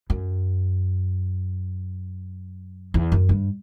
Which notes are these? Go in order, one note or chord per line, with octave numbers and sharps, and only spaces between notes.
F#2
E2
F#2
G2